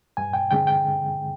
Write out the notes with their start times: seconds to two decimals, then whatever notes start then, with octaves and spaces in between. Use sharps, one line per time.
0.17 G2 G#5
0.33 G5
0.51 D3 G#3 C4 G5
0.67 G5